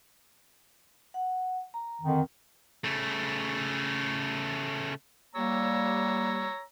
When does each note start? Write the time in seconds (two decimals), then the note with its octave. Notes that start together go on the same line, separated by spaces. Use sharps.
1.14 F#5
1.74 A#5
2.02 F2 D3 D#3
2.84 C#3 A3
5.35 G3 A#3 C#5 A#5 E6